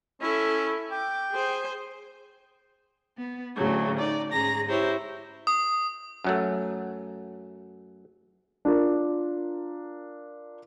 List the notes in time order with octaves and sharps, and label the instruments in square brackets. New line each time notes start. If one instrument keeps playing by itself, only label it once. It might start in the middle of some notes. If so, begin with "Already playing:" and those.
[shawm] C#4 [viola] E4 A4
[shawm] G5 [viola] D6
[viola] G#4 C5
[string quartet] B3
D2 A2 C#3 F#3 A3
D#4 D5
G#2 C#4 G#4 A#5 A#6
E4 G4 C5 C#5
[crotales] D#6
[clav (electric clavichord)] F#2 F#3 A3
[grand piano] D4 F4 A#4